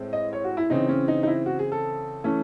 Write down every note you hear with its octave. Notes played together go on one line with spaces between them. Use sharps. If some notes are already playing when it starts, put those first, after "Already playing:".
Already playing: A2 G#3 C4
D#5
C#5
F#4
E4
C#3 E3 C4 D#4
C#4
D#4
D#4
E4
F#4
G#4
A4
E3 A3 C#4